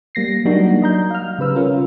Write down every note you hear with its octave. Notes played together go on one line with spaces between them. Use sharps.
G3 A#3 A#6 C7
F#3 G3 A#3 D4 D#4 F#4
F#3 D#5 A#5 G6
F5 F6
C#3 G3 B4 E6
C#4 F4 A#4